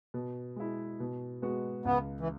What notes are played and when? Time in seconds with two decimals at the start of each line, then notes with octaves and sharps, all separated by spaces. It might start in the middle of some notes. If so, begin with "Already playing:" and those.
0.14 B2
0.56 G#3 E4
1.00 B2
1.42 G#3 B3 F#4
1.85 C#2 B3
2.20 E3